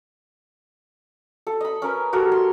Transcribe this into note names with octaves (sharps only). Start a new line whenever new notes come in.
A4
D#5 B5
C#4 A#4 B4
F#4 G4 A4 A#4
C6